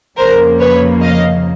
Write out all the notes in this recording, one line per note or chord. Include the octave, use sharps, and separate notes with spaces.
F2 C#3 F3 A#3 A#4 C5
B4 C#5
D#5 F5